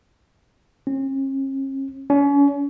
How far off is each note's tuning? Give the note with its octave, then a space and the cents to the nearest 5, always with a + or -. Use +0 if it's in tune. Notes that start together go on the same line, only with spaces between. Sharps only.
C#4 -45
C#4 +35